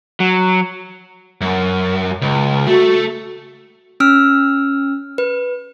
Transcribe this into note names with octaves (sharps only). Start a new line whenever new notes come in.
F#3
F#2
C#2
A3 F#4
C#4 E6 F6
B4